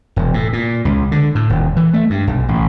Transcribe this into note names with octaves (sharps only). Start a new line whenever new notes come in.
E1
A2
A#2
C#2
D3
A2
D#1
E3
A3
G2
B1
A1